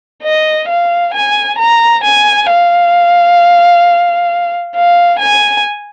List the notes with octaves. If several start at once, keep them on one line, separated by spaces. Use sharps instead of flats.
D#5
F5
G#5
A#5
G#5
F5
F5
G#5